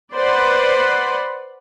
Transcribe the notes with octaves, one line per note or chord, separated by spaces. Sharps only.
B4 C5 D5 F#5 B5 C6